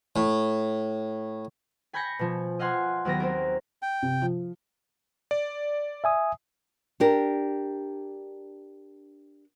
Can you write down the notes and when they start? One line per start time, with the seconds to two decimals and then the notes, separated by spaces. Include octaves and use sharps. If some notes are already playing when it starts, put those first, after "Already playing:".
0.16 A2
1.93 G#5 B5 G6 G#6 A#6 C#7
2.19 B2 F3
2.59 D#5 F5 F#5 G#5 C6
3.05 D#2 F#3 B3 A#4 A#6
3.20 C4 D#4 A#4
3.82 G5
4.02 C3
4.22 F3
5.31 D5
6.04 E5 G#5 D#6
7.00 D4 G4 A#4